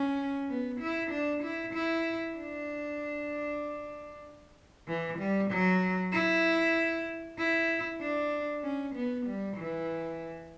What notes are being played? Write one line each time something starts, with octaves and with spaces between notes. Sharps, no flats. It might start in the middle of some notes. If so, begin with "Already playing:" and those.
Already playing: C#4
B3
E4
D4
E4
E4
D4
E3
G3
F#3
E4
E4
D4
C#4
B3
G3
E3